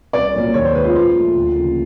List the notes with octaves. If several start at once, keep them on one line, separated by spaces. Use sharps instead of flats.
C2 D5
A#2 F#3 A#3
D#2 C#5
C5
D#3 G#3 B4
F4
A#2 F4
F3 A3
D2
C#3 F3 A#3